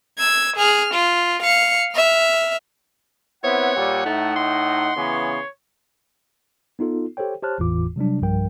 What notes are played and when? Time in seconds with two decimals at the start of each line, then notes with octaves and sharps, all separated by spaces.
0.18 E6 G#6
0.57 G#4 F6
0.94 F4
1.43 F5 C#7
1.94 E5 F6
3.44 B3 C4 E4 C#5 F#5
3.76 A#2 G3
4.06 A2 A3 D#4
4.36 C6
4.97 C#3 E3 B3 C#5
6.79 B3 D#4 F4 A4
7.17 G4 A4 C5 C#5 G5
7.43 G4 C5 C#5 A5 F6 F#6
7.58 G1 E2 A2 E3 F4 D6
7.96 C3 F#3 G3 D4
8.22 B1 G2 F3 G3 A#4 G5